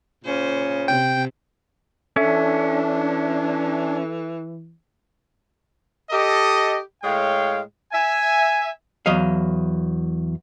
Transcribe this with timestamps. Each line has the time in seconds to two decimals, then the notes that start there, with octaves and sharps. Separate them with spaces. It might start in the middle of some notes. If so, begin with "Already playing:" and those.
0.25 A#2 C#3 C#4 C5
0.88 C3 G5
2.16 E3 C#4 D4 A4 E5
6.10 G4 A4 D#5
7.03 A2 G#3 C#5 F5 G5
7.92 E5 G#5
9.06 E2 F#3 D#5 F5